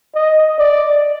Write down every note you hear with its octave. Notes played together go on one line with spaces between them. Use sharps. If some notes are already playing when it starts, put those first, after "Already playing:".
D#5
D5